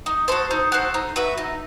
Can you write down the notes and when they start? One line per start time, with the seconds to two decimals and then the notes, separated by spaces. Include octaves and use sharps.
0.06 D#4
0.28 F#4 A4 C5
0.51 D#4
0.72 F#4 A4 C5
0.94 D#4
1.16 F#4 B4 E5
1.38 D#4